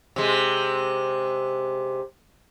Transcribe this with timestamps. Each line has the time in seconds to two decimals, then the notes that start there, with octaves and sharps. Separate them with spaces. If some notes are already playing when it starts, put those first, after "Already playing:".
0.16 C3 G#3